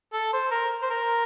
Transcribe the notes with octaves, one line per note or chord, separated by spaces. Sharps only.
A4
C5
A#4
C5
A#4